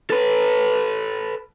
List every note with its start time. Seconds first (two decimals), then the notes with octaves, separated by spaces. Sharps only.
0.10 A4 B4